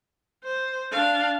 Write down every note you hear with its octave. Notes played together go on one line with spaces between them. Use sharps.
C5
D4 F5